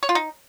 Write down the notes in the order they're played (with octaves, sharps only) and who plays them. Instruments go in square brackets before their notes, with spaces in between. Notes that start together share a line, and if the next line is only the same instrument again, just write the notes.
[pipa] C#5
F4
D#4